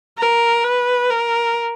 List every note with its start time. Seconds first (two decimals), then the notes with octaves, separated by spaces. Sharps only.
0.18 A#4
0.64 B4
1.10 A#4